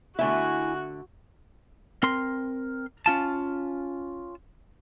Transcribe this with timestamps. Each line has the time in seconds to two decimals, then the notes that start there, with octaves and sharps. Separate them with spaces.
0.19 D3 A3 E4 F#4 E5 G#5
2.03 C4 A#4 C6
3.06 C#4 F4 A5